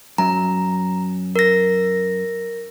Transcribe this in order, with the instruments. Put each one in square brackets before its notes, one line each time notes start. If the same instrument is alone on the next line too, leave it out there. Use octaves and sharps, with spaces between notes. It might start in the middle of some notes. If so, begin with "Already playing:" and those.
[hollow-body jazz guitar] F#2 [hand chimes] A#5
[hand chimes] A#4 A#6